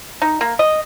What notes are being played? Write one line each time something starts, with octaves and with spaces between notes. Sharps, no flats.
D#4
A#3
D#5